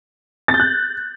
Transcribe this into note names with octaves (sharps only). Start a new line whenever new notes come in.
A6
G6
F#6